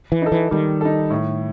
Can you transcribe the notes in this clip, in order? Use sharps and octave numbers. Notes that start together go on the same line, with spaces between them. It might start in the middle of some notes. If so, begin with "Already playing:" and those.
E3
D#4 A4
E3
D#3 G3
D#4 A4
A2